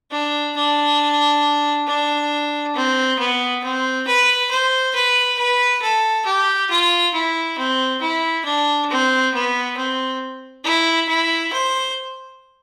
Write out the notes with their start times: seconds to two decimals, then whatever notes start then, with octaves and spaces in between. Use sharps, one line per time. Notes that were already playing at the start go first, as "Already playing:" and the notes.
0.11 D4
0.56 D4
1.87 D4
2.76 C4
3.19 B3
3.64 C4
4.07 B4
4.51 C5
4.95 B4
5.38 B4
5.82 A4
6.26 G4
6.71 F4
7.13 E4
7.58 C4
8.01 E4
8.45 D4
8.90 C4
9.34 B3
9.77 C4
10.65 E4
11.08 E4
11.53 C5